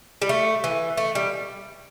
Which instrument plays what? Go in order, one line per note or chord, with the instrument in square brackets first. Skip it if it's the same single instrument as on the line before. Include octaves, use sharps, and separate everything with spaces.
[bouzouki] G3
A3
E3
A3
G3